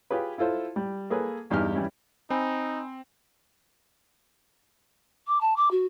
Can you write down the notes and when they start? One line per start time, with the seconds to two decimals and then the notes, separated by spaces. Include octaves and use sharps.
0.10 F4 G4 G#4 B4
0.38 E4 F4 A4 C5
0.76 G3
1.10 A#3 G#4 A4 B4
1.50 E2 G2 D#4 G4 G#5 F6
1.75 E3 G3 C#4 E4
2.30 C4 D#4 G#5 B5
5.27 D6
5.41 A5
5.56 D6
5.71 F#4